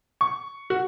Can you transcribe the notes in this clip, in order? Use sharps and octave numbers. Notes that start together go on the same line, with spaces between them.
C#6
F#4